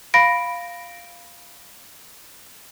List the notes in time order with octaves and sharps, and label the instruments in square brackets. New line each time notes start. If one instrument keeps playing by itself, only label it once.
[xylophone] F5 B5 A#6 D7